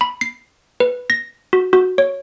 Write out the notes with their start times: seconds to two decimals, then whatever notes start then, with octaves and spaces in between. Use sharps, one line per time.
0.01 B5
0.21 C7
0.80 B4
1.10 A#6
1.53 F#4
1.73 F#4
1.98 C#5